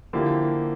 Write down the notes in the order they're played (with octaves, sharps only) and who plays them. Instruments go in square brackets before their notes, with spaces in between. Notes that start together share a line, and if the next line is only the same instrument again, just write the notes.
[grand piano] D3 F3 A#3 E4 G4